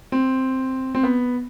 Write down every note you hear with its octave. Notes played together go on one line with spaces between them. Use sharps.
C4
C4
B3